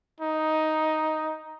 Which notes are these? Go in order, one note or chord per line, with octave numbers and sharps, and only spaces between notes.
D#4